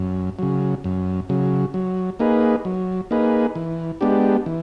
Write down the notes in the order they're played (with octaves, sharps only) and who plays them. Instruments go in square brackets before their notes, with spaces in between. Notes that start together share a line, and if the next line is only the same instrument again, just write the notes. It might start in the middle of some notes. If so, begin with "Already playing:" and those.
Already playing: [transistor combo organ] F#2
C#3 F#3
F#2
C#3 F#3
F#3
A#3 D#4 G#4 B4
F#3
A#3 D#4 G#4 B4
E3
G#3 B3 D4 G4
E3